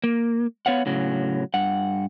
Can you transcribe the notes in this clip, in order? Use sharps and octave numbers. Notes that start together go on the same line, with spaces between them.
A#3
B3 C#5 F5 F#5
A2 C#3 F#3
G2 F#5